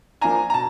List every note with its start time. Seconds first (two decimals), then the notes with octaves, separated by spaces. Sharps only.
0.21 F3 A#3 D4 G#5 A#5
0.50 A#5
0.54 B2 A5